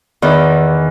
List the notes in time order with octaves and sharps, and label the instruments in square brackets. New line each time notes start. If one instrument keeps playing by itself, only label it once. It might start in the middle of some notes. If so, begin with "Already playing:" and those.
[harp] E2 D#3 E3